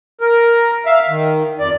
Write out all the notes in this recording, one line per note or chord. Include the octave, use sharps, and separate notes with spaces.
A#4
E5 F5
D#3
F2 D5